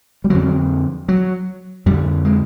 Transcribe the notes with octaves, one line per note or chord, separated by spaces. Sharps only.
G3
F2 D3 F#3
F#3
F2 D3 G3
G#3